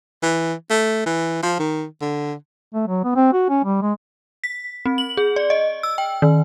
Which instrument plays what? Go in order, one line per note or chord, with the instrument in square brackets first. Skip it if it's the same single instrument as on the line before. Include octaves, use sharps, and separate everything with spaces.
[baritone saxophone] E3
A3
E3
F3
D#3
D3
[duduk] A3
F#3
B3
C4
F#4
C#4
G3
G#3
[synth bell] B6
C4
F#7
G#4
D5
D#5
E6
G5
D#3